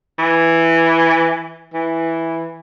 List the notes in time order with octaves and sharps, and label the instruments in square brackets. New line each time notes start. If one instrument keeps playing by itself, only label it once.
[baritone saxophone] E3
E3